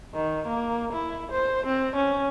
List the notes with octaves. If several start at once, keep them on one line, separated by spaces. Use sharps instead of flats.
D#3
A#3
E4
C5
C4
C#4